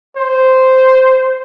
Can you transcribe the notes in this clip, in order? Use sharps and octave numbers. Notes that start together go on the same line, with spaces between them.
C5